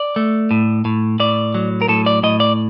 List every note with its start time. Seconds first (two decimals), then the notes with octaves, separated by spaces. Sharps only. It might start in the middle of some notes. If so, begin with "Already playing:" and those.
Already playing: D5
0.16 A3
0.51 A2
0.85 A2
1.20 A2 D5
1.54 F#3
1.82 A#4
1.88 A2 A4
2.06 D5
2.23 A2 D#5
2.40 D5